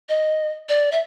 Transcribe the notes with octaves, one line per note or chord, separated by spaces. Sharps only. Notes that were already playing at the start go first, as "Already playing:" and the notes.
D#5
D5
E5